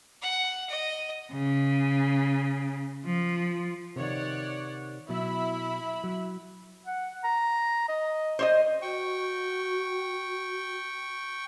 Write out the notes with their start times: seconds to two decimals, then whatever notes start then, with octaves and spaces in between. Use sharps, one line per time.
0.22 F#5
0.69 D#5
1.32 C#3
3.05 F3
3.96 C3 D#3 C#5 D5 F#5
5.09 B2 F#3 E4 E5 B5
6.04 F#3
6.86 F#5
7.24 A#5
7.89 D#5
8.39 C5 C#5 D#5
8.82 F#4 G5 C#6